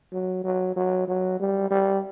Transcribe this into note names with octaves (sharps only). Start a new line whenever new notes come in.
F#3
F#3
F#3
F#3
G3
G3